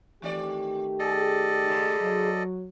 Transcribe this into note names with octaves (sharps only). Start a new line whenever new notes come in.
D#3 E3 A3 C4 G4 D5
G#4 A4 D5 D#5
G#2 C#3
F#3